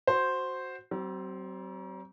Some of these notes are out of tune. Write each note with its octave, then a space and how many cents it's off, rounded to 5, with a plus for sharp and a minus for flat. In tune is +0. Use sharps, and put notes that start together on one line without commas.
F#4 +0 C5 +0
F#3 +45 C4 +0